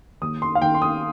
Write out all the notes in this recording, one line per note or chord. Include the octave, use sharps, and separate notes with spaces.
D#2 D#6
C6
F5
D#3 G5
C6
D#6